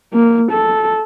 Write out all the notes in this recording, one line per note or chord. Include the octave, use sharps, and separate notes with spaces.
A#3
A4